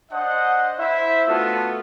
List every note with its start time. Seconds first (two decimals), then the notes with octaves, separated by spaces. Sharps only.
0.12 D4 C5 D#5 F#5
0.79 E4 C5 E5
1.28 A3 B3 D4 F4 F#4 A4